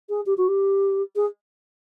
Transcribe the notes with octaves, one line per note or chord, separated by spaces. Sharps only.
G#4
G4
F#4
G4
G#4